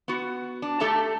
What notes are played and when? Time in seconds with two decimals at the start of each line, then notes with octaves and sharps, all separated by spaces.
0.08 B3 F#4
0.62 D4
0.80 A3 G4 A4 E5 A5 A#5